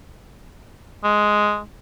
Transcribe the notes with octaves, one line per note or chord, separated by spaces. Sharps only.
G#3